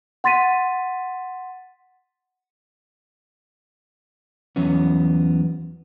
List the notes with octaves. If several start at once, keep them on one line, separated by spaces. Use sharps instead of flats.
F#5 C6 A6 B6 D#7
E2 E3 F#3 B3 C#4